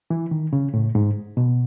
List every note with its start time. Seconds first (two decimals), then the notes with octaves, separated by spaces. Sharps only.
0.10 E3
0.31 D#3
0.53 C#3
0.74 A2
0.95 G#2
1.37 B2